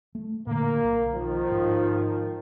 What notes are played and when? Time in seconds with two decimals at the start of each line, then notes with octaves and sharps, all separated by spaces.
0.15 A3
0.47 A#2 D3 A#3
0.83 B1
1.14 D#3 F3
1.51 G#2